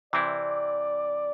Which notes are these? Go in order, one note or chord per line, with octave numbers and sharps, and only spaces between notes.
C3 E3 C4 E4 D5